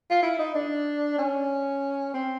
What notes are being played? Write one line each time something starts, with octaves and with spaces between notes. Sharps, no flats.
F4
E4
D#4
D4
C#4
C4